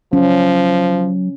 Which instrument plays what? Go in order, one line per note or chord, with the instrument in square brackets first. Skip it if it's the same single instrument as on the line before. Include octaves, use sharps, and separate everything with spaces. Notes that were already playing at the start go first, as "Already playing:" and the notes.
[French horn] F3 [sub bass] F#3 [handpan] C#4